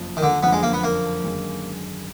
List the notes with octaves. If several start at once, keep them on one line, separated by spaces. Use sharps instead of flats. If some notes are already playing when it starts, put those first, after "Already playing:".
Already playing: F#1 F2 F3
D#3
D3
F#1 F2 D3 F3 B3
G#3
A#3
B3
A#3
G#1 F#2 D3 G#3